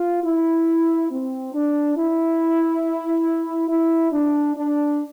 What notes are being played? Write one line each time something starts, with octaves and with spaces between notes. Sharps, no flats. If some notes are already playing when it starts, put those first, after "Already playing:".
Already playing: F4
E4
C4
D4
E4
E4
D4
D4